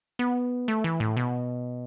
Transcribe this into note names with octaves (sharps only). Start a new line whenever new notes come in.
B3
A3
E3
A2
B2